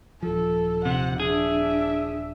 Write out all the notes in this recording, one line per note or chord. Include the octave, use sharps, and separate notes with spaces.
D#1 F3 A4
C3 F#5
D4 G#4 E5